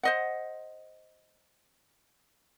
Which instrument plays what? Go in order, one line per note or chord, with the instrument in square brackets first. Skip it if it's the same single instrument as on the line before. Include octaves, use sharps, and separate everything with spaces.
[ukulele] C5 D#5 F#5